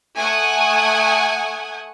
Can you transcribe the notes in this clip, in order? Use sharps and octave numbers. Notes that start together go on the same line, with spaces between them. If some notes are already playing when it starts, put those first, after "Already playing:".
A3 F#5 G#5 D#6 G#6